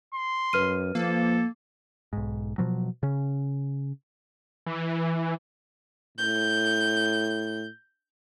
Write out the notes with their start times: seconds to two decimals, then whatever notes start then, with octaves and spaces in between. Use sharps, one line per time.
0.14 C6
0.53 F#2 B4 F6 D#7
0.95 F3 A#3 A4
2.13 B1 G#2
2.58 B2 F3 F#3
3.03 C#3 C#4
4.66 E3
6.18 A2 G6